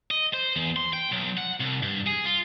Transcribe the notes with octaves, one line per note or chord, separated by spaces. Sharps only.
D#5
C5
E2
C6
G5
B1
F#5
C2
G2
G#4
F4